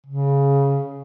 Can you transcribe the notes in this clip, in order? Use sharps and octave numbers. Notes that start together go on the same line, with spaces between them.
C#3